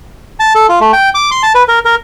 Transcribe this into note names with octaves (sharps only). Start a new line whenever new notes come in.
A5
A4
F4
A3
G5
D6
C6
A5
B4
A#4
A#4